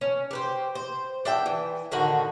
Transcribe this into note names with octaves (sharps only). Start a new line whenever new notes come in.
C#4
G4 B4 C5
C5
D4 E5 G5
E3
A2 D3 D#3 F#4